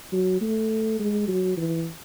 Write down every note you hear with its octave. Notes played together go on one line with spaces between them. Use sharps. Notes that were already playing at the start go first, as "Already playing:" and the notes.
F#3
A3
G#3
F#3
E3